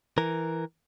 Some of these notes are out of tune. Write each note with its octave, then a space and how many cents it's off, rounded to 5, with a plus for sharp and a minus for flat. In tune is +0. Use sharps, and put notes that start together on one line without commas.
E3 +0 A#4 +0